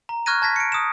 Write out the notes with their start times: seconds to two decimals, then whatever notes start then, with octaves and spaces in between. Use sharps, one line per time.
0.09 A#5
0.26 C#6 F6 F#6 G#6 A#6 D#7
0.42 A5 G#6 A#6 B6
0.56 C#7 D7
0.72 D#6 E7